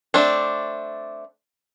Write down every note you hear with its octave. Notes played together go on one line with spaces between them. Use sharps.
A3 C4 D4